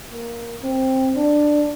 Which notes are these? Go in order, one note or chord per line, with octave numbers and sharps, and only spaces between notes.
A#3
C4
D4